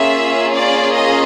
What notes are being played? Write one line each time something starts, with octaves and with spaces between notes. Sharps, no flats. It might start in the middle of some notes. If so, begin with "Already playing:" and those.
Already playing: A#3 C#4 F4 G#4 E5
D5
D#5